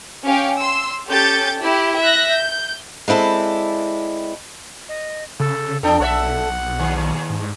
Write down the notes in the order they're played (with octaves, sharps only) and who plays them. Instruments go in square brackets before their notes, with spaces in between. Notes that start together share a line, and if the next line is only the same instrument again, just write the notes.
[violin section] C#4 G4 F5 G5
C6 E6
C#4 G4 A4 G6 A6
E4 G4
E5 F#6 A#6
G6
[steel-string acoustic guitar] G#3 C4 E4 A4 D5
[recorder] D#5
[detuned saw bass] C#3 [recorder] A4
[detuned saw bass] F2 [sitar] D4 A4 [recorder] G5
[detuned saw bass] B1 [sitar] A4 C#5 E5 [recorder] F#5
[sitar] D#2
[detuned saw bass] G#2